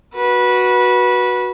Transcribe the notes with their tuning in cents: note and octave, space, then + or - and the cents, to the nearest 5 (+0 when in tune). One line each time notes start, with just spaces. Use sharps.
F#4 +0 B4 -20